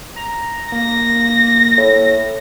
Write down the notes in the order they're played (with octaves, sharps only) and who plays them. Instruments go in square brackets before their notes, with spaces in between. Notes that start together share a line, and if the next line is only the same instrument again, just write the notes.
[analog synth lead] A#5
[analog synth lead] A#3 [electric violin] A#6
[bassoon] A2